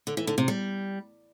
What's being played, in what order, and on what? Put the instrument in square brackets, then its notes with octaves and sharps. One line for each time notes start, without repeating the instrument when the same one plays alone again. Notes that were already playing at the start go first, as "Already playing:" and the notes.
[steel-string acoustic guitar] D3
E3
D3
C3
G3